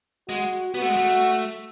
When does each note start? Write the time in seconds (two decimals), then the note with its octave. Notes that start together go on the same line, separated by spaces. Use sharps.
0.28 G#3 F#4
0.74 B3 F#4
0.82 A3
0.89 G#3
0.96 A3